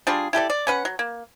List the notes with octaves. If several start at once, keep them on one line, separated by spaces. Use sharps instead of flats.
G3 D4 F4 G#4
E4 G4 A4 D5
D5
C#4 B4 F#5
F#3
A#3